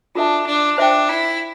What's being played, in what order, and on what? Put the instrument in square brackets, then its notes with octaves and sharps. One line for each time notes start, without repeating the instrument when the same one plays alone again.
[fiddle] D4 [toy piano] F4 A4 E5 A5
[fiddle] D4
[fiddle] D4 [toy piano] C5 E5 G5
[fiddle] E4